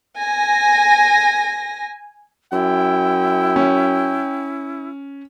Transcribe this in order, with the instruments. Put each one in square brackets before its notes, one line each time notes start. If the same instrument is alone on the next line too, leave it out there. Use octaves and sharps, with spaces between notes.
[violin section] G#5 A#6
[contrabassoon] F#2 [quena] E4 [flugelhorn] G5
[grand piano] C#4